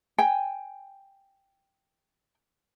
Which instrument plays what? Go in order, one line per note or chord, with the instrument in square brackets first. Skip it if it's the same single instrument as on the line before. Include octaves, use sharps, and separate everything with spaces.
[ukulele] G5 G#5